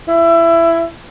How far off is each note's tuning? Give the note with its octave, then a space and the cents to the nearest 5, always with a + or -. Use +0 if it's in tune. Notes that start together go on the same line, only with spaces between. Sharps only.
E4 +20